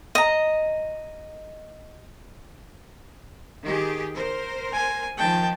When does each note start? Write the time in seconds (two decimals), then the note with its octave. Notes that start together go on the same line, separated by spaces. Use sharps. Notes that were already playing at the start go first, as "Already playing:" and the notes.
0.15 D#5 A#5
3.64 D#3 G4 G#4
4.14 A#4 C5
4.73 G#5
5.18 D#3 F3 G5 A5